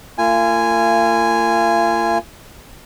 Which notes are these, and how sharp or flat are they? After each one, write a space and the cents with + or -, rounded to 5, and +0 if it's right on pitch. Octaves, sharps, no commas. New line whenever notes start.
A#3 -40 F4 -35 G#5 -5